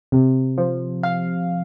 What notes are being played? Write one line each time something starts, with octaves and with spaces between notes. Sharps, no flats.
C3
F3
F5